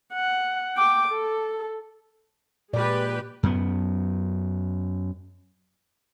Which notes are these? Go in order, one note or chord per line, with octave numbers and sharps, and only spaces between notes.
F#5
G5 D6
A4
A#2 G#3 G4 B4 D5
F#2 B3